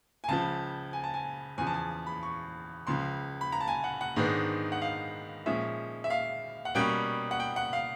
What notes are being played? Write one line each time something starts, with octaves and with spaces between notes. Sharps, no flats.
G#5
C#2 C#3 F3 A5
G#5
A5
G#5
E2 C#3 F3 G#5
A5
G#5
B5
C#6
C#2 C#3 F3 C6
B5
A#5
A5
G#5
F#5
F#5
G#2 D#3 G#3 B3 D4
F#5
F5
A#2 F3 G#3 C#4 E5
E5
F5
F#5
B2 G3 A#3 C#4 G5
F#5
G5
F#5
F5